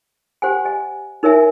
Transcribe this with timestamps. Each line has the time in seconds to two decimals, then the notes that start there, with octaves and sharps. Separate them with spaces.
0.42 G4 C5 F#5 G#5
0.65 D#5 G#5
1.23 D#4 A#4 C#5 E5 G#5